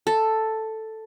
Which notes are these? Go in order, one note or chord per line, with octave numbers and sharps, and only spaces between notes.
A4